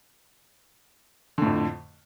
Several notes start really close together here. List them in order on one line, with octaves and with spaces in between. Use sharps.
D3 A2 F2